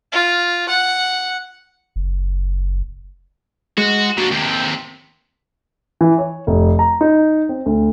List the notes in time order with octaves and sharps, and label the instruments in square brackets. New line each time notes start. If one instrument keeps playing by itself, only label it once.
[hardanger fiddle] F4
F#5
[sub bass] F#1
[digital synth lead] G#3 [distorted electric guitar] F#4
[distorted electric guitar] A#2 D4 [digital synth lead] F#4
[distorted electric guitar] D#2 C3 [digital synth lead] G5
[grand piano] E3
C#5
F1
A#5
D#4
C4
D2